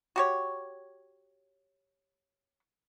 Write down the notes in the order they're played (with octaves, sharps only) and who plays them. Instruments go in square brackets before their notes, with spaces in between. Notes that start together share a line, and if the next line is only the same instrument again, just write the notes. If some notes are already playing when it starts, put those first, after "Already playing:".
[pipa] F#4 G4 C#5